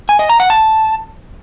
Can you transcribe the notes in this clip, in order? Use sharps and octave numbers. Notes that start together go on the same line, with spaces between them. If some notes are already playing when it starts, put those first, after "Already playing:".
G#5
D#5
A#5
F#5
A5